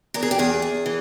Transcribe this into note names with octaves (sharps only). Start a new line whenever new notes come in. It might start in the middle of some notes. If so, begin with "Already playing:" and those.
E2 A#4
G#4
G4
E2 G#4
E2
E3